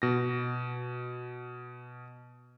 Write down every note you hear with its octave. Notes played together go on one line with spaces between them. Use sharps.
B2 A#6